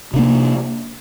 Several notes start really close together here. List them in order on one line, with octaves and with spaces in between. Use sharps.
C3 D4 A#3